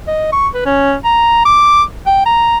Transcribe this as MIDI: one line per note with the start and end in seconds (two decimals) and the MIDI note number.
0.07 0.30 75
0.32 0.48 85
0.54 0.64 71
0.66 0.94 61
1.04 1.41 82
1.45 1.83 86
2.06 2.22 79
2.26 2.58 82